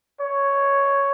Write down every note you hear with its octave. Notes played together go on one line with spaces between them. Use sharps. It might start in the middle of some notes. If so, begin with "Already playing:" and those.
C#5